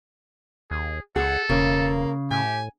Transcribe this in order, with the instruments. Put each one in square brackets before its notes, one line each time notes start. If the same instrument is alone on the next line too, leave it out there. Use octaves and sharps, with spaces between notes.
[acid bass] D#2 [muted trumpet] G#4
[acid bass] C#2 [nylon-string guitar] G#4 [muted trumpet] A4 [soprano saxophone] F#5
[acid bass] E1 [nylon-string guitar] C#3 [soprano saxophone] A#3
[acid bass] A2 [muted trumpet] G4 [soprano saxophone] G#5